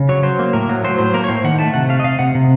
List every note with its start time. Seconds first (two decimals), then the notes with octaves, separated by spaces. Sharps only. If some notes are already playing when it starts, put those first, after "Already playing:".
Already playing: C#3
0.09 F#3 C#5
0.23 F#3 C5
0.39 A#3
0.53 A2 A#4
0.69 F#3
0.84 F#3 C5
0.98 A2 C5
1.14 A#3 A#4
1.24 C#5
1.28 A2 C5
1.44 D#3 F#5
1.59 A3 A5
1.74 C3 F#5
1.89 A3 F5
2.00 D#5
2.04 C3 F5
2.19 C3 F#5
2.35 C3